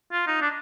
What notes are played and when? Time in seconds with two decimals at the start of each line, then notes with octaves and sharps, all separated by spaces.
0.12 F4
0.27 D#4
0.42 D4